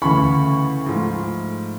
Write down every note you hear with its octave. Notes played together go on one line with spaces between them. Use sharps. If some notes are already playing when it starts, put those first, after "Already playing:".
D2 C#3 E3 B5 C#6
G#2 F3 A3